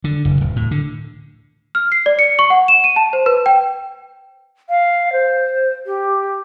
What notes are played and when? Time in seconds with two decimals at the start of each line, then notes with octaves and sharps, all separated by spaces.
0.04 D3
0.25 F#1
0.41 D1
0.56 A2
0.71 D3
1.75 F6
1.92 C7
2.06 D5
2.19 C#7
2.39 C#6
2.50 F#5
2.68 E7
2.84 D#7
2.96 A5
3.13 C5
3.26 B4
3.46 G5
4.69 F5
5.13 C5
5.86 G4